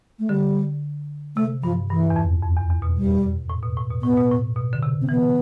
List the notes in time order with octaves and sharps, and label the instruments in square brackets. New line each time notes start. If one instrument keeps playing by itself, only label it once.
[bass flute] A3
[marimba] D3 [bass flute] G3
[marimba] C3 [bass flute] A3
[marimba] G2 [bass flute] F3
[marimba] G2 [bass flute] E3
[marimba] E2
F2
F2
E2
E2
B2
[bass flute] G3
[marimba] A2
B2
A2
B2
[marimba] A2 [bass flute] B3
[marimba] B2
A2
B2
D3
C3
[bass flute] C4
[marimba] E3 [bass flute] B3